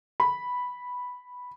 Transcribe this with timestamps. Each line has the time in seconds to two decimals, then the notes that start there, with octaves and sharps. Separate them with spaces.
0.20 B5